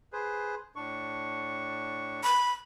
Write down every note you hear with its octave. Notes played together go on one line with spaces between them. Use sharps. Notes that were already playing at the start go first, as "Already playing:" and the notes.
G#4 B4 C5
A2 D4 C#6
B5